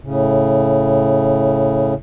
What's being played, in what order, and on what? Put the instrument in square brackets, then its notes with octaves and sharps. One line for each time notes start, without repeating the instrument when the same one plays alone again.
[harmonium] A2 C#3